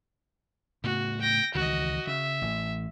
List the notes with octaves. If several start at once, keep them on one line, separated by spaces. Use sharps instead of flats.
A2 C#3 B3 F#4
G5 A#6
C#2 D#3 E3 F#4 D#5
C#3 E5
A1 A2